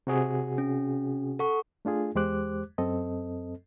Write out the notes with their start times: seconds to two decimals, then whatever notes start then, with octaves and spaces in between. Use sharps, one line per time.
0.07 C3 F#4 G#4
0.58 C#4
1.39 A4 F#5 C#6
1.85 A3 D4 F4 G#4
2.15 E2 G#3 G4 C5 D6 F#6
2.78 F#2 C4 A4 D#5